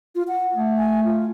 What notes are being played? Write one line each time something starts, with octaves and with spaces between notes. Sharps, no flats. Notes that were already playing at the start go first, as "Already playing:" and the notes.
F4
F#5
A3
G#5
F4